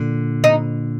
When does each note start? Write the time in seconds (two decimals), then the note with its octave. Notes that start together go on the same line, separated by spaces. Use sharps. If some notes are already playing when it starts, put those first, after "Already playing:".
Already playing: A#2 D3
0.44 D#4